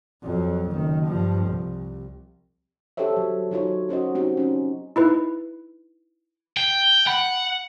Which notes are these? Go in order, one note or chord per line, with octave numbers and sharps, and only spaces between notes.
F2 F#3
F#1 D#3
G2 F3
C2
D4 G4 A4 C5 C#5 E5
F#3
F#3 D#4 F4 C#5
C#4 F#4 C5 D#5
C4 D#4 F#4 G4
C#4 D#4
D#4 E4 B4
G5
F#5 B5